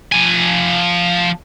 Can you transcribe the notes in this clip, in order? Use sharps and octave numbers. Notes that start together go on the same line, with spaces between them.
F3 G#5